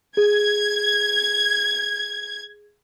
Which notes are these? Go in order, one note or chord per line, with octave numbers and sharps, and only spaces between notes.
G#4 G#6